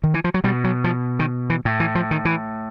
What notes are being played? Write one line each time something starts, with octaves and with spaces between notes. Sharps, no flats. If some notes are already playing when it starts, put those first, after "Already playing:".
D#3
E3
F3
F#3
B2 G3
F#3
F3
D#3
E3
A2
E3
F3
D#3
E3